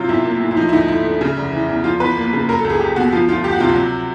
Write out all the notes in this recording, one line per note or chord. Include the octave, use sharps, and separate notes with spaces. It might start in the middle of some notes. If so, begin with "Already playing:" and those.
Already playing: C3 F#3 F4
B1 E4
A#3
A2
E4
F3 D#4
E4
D2 D#4
A3 E4
D3
C#3
F1
E3
E2
F3 F4
E2 B4
A#3
C#3
F#3 A#4
A4
C#2 G#4
C#2 G4
B2 F#4
F3 F4
D2 F4
D2 G4
F#4
C3 F4
F#4
F#3